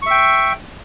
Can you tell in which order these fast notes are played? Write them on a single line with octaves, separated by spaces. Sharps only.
C#6 E5 G5